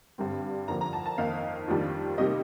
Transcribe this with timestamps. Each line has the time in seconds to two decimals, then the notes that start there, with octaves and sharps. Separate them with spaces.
0.18 G2 D3 G3 C4
0.68 F2 D3 F3 A#3 A#5
0.81 A#5
0.93 A5
1.06 A5
1.18 F2 D#3 A#3 D#4 F5
1.68 F2 D#3 G3 D4 F4
2.18 C3 G3 A#3 D#4 D#5